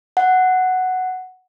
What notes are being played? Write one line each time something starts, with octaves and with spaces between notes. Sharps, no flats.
F#5